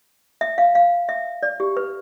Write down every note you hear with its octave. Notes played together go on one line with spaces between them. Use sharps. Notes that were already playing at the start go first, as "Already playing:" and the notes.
E5
F5
F5
E5
D5
G4
B4